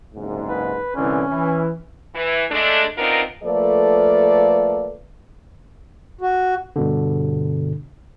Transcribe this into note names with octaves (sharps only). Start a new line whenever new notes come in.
F#1 C2 G#2
B4
C2 D3 E3 C#4
E3
E3
G#3 A3 D4
B3 C4 D4 D#4 F4 A#4
F3 A3 A#3 A4 B4 D5
F#4
G2 B2 D3